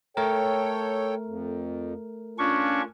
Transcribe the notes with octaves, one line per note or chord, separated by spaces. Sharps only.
A3 A4 A#4 C#5 G5
F2
C#4 D4 F4 C#6